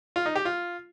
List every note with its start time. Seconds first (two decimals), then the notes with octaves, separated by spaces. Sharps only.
0.16 F4
0.26 D#4
0.35 G4
0.45 F4